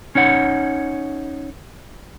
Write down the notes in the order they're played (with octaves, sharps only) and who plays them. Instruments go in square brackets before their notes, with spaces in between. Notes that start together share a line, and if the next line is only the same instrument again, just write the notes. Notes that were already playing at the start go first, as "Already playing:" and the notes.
[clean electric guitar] C#4 D#4 C#5 F#5